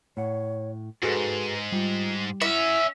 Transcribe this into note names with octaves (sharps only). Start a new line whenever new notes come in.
A2 C#5 F#5
G#2 F#4 G#4 A4 B4
G3 F4
C#4 E4 F#4 E5